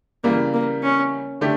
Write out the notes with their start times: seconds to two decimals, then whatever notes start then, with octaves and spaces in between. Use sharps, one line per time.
0.24 C#3 E3 G3 A#3
0.54 A#3
0.83 C#4
1.41 D3 A3 D4 G4